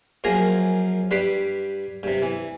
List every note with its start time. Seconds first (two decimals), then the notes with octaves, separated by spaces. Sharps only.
0.24 F#2 F3 A#3 G#4 A#5
1.11 G2 G3 B4 C6 D6
2.03 G2 C3
2.22 E3